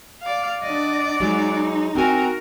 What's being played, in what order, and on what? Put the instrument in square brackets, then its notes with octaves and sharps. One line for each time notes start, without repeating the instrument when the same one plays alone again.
[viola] D5 F5
[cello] D4 D#5 [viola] D5 F#5
[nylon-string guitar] F#3 G#3 [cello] D#4
[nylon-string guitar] C4 G#5 [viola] F#4 A#4